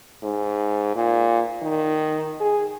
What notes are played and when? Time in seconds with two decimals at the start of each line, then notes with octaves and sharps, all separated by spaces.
0.23 G#2
0.95 A#2
1.62 D#3
2.40 G#4